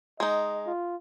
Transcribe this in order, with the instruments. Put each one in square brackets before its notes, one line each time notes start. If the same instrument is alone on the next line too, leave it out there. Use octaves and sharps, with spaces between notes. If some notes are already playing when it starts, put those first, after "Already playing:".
[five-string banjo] G#3 D#4 [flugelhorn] D#5
[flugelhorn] F4